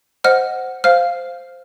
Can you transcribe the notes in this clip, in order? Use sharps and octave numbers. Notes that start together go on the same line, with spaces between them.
C5 D#5 F#5 F6
C5 F5 F6